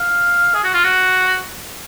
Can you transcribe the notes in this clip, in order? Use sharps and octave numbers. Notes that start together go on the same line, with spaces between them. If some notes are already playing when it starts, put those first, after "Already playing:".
Already playing: F5
G#4
F#4
F4
F#4